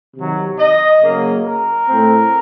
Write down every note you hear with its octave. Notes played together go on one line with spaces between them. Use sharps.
C3 D#3 F#3
D#5
C#3 F#3 A#3
A#4
A2 A3 C4